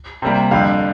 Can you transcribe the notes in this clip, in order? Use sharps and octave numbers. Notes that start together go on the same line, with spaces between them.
C3 G3 A#3
F2 D3 G3 F5